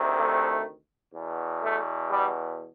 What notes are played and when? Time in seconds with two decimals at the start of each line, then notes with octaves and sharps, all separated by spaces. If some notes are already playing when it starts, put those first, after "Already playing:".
Already playing: D2 C3 D#3
0.18 A3
1.13 E2
1.18 B2
1.61 A3
2.10 G3